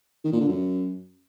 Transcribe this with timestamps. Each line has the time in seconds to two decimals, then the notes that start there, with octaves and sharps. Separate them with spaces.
0.25 D#3
0.33 A#2
0.41 D3
0.49 F#2